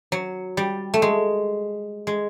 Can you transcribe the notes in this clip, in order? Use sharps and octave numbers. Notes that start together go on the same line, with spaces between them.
F#3
G3
A3
G#3
G#3